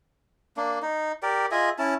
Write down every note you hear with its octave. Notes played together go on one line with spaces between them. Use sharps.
A#3 D4
D#4
G4 A#4 D5
F4 G#4 D#5 E5
C#4 E4 A5